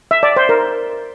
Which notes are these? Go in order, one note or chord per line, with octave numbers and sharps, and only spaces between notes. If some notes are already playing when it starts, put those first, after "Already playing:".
E5
D5
C5
A#4